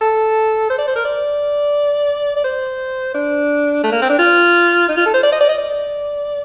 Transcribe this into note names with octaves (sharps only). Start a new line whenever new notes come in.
A4
C5
D5
C5
A#4
D5
D5
C5
D4
A3
A#3
C4
D4
F4
D#4
F4
A4
C5
D5
D#5
D5
D#5
D5